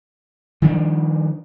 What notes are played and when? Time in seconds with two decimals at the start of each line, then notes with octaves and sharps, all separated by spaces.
0.62 D#3 F3 G3 D4